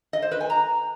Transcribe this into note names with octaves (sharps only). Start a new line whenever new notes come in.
D#5
C5
B4
G#5
A#5